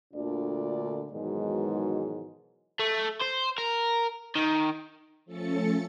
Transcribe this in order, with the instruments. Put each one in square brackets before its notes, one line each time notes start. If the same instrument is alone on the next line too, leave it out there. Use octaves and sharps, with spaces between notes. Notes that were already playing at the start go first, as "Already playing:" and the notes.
[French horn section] D2 A#2 D3 D4 F4 D5
G#2 B2 D#3 E3 F#3 G#3
[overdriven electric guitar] A3
C5
A#4
D#3
[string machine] F3 A3 C#4 A4 A6 C#7